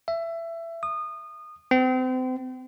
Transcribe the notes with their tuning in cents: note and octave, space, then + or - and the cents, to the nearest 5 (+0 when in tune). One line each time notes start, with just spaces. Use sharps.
E5 +20
D#6 -25
C4 -35